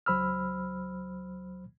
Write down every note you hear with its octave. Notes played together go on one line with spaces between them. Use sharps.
C#2 F#3 C5 B5 E6 F6